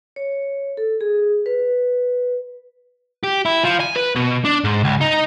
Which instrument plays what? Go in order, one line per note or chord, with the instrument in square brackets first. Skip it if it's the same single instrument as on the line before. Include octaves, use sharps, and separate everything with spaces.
[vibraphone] C#5
A4
G#4
B4
[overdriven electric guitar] G4
E4
F3
G#5
B4
B2
D4
G#2
C#2
D#4